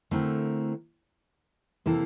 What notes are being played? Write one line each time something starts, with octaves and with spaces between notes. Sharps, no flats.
D3 A3 C4 E4 A#4
C3 E3 A#3 E4 A4